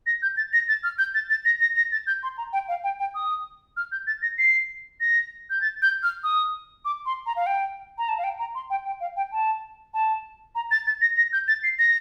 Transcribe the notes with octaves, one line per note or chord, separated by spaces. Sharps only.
A#6
G6
A6
A#6
A6
F6
G6
A6
A6
A#6
A#6
A#6
A6
G6
C6
A#5
G5
F5
G5
G5
D#6
F6
G6
A6
A#6
C7
A#6
G6
A6
G6
F6
D#6
D6
C6
A#5
F5
G5
A#5
A5
F5
G5
A#5
C6
G5
G5
F5
G5
A5
A5
A#5
A6
A6
A#6
A#6
G6
A6
C7
A#6